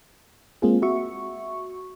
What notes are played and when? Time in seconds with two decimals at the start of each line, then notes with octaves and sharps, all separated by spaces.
0.62 G#3 A#3 C4 F4 G#4
0.82 F#4 E5 C#6